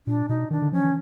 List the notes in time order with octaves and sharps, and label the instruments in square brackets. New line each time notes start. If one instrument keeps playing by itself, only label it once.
[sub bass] A#2 [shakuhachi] D4
[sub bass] B2 [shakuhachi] D#4
[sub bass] D#3 [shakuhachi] D4
[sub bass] D3
[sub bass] F3 [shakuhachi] C#4
[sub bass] E3